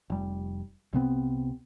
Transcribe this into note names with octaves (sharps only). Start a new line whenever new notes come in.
F1 G3
C2 C3 B3 C4